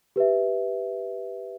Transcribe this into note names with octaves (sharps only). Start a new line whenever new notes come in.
G4 B4 E5